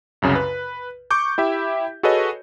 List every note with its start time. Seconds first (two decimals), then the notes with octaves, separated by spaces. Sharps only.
0.22 C2 F#2 C#3
0.35 B4
1.11 C#6 D6 G6
1.38 E4 G4 E5
2.03 F#4 G#4 A4 B4 C#5 D#5